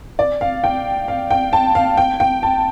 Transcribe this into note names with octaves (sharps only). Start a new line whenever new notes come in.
D5
F5
G5
F5
G5
A5
F5
G5
G5
A5